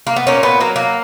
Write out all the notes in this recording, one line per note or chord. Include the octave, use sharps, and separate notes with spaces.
A#3
B3
A#2 A#3 C#4
B3
F#3 A#3
A#3